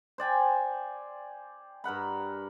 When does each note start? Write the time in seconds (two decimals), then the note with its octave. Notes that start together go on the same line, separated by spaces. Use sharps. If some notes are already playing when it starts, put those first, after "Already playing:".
0.18 C5 D5 G5 G#5
1.84 G2 A#4 F#5 B5